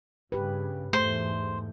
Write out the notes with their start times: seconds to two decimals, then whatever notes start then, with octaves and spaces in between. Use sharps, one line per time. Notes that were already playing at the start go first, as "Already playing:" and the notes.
0.32 G2 C#3 G4 B4
0.93 E2 G#2 A3 C5